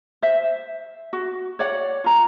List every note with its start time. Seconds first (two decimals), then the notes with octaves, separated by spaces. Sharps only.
0.22 C5 E5
1.13 F#4
1.59 C#5 D5 F#5
2.04 F4 A#5